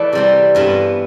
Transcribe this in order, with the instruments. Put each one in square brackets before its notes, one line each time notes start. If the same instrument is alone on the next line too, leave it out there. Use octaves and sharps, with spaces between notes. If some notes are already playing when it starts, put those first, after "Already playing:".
Already playing: [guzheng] E3 A3 E4 A4 D5
C3 G3 C4
G2 E3 B3 E4 A4